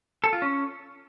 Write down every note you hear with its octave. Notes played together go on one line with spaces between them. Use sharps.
A4
F4
C#4